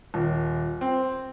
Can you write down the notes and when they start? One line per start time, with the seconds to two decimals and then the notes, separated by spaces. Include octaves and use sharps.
0.14 D#1
0.81 C4